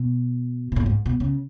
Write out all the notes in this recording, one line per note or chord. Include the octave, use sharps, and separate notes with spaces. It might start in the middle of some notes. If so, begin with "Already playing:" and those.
Already playing: B2
B2
A2
G#2
B2
C#3